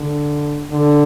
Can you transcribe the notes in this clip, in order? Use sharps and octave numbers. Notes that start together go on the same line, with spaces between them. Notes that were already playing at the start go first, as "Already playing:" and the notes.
Already playing: D3
D3